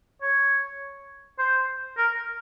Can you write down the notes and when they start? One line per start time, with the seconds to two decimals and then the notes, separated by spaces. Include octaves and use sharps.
0.22 C#5
1.39 C5
1.97 A#4